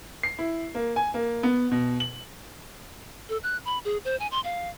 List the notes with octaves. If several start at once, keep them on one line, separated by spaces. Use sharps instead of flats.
C7
E4
A#3
G#5
A#3
B3
B2
F#7
A4
F#6
B5
G#4
C5
G#5
C6
F5